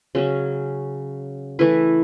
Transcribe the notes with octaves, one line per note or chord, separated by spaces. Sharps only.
C#3 F#3 C#4
E3 A3 E4 B4